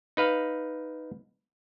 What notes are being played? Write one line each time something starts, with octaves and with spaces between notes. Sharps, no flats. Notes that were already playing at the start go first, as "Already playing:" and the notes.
D#4 B4 F5